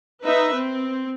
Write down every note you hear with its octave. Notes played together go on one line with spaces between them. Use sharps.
D#4 B4 E5
C4